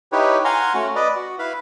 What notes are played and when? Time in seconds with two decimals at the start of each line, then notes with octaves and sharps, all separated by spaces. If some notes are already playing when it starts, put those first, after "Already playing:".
0.12 D#4 E4 G4 B4 C#5
0.45 F5 F#5 G#5 A#5 C6
0.74 A3 C#4 F#4
0.95 B4 D5 D#5
1.16 F#4
1.39 E4 B4 F5 B5